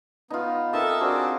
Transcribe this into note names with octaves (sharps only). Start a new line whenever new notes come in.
B3 D#4 F4
D#3 C4 A4 D#5 E5 A5
C4 D4 F#4 G#4 A#4 C6